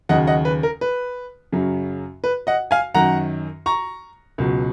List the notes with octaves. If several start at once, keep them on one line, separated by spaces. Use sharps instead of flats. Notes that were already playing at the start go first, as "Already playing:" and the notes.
D#2 C#3 F#3 D#5 F#5
D#5 F#5
B4
A#4
B4
F#2 C#3 F#3
B4
D#5 F#5
F5 G#5
F#2 D#3 F#3 F#5 A#5
A#5 C#6
C#2 B2 F#3